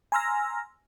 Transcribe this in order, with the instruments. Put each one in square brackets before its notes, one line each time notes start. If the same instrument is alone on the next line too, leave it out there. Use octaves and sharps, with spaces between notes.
[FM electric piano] G#5 A#5 C6 E6 F6 A#6